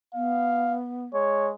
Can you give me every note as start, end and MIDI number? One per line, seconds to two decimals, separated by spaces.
0.14 1.06 59
0.14 0.77 77
1.14 1.54 56
1.14 1.50 73